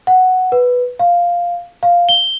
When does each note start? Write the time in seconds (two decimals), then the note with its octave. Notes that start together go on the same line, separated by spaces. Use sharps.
0.07 F#5
0.52 B4
0.99 F5
1.83 F5
2.09 G7